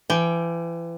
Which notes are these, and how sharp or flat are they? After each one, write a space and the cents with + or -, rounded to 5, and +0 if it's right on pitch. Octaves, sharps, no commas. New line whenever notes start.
E3 +35 G5 +0